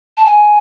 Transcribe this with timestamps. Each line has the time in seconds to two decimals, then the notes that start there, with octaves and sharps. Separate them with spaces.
0.17 A5
0.25 G#5